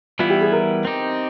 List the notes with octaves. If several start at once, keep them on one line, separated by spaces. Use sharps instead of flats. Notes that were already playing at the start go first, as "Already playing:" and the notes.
E3 G3 B3 E4 F4
G4
G#4
A#4
C4 D#4 G4